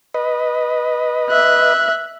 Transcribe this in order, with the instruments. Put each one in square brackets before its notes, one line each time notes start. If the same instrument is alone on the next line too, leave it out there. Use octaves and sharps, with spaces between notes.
[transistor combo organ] B4 D#5
[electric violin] E5 F#6